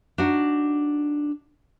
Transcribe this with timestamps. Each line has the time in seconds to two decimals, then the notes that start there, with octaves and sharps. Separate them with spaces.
0.18 D4 D#4 F#4